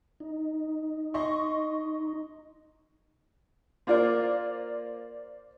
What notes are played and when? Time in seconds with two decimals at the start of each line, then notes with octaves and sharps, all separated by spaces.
0.20 D#4
1.14 D#5 C6 C#6
3.87 A#3 F4 A#4 C5 D5 F5